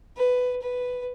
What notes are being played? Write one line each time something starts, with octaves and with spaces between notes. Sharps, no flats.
B4
B4